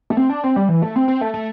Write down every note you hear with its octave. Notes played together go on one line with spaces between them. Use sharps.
A3
C4
D4
C4
G3
E3
A3
C4
C4
A3
A3